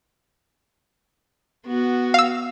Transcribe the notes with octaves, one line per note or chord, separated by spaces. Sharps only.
B3 F#4
F5 E6